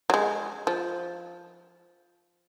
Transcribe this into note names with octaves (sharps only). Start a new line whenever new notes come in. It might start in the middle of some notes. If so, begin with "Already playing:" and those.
F#3
G#3
F3